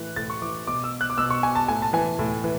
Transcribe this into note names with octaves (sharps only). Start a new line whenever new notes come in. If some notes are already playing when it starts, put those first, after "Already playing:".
Already playing: A2 E3 F#6
A2 A6
C#6
E3 D6
B2 D6
E6
F#6
D6
B2 E6
C#6
G#5
A5
A2 G#5
A5
E3 G#5
A2
E3